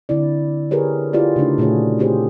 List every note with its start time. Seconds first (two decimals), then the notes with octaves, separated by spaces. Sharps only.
0.09 D3 C4 E4 D5
0.71 G4 G#4 A#4 B4 C#5
1.13 E4 F4 G4 G#4 D5
1.36 C#3 A3 D4 D#4
1.58 A#2 A3 F#4 G#4 C#5
1.99 C4 F4 G4 G#4 C5